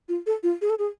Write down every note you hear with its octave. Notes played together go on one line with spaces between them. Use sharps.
F4
A4
F4
G#4
A4
G#4